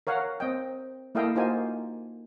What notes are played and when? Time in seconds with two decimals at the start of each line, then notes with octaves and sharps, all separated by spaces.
0.07 A#4 C#5 F5 F#5
0.40 C4 D#5 G5
1.15 A#3 E4 A4 D#5 F5 G5
1.35 A#3 D#4 F4 F#4 C5 G#5